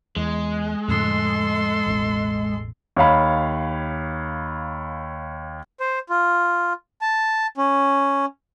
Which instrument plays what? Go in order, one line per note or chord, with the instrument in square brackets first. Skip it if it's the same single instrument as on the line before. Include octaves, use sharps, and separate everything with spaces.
[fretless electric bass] E2 [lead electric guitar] G#3
[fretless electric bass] F2 A2 D3 [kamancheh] A4 C6
[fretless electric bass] E1 A1
[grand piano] D#2 C#5 F5 B5
[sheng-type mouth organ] C5
F4
A5
C#4